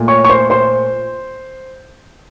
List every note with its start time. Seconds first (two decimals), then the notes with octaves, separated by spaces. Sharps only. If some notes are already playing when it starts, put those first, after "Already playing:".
Already playing: A#2 A3
0.08 C#5 C#6
0.25 C#6
0.29 C5 C6
0.50 C5 C6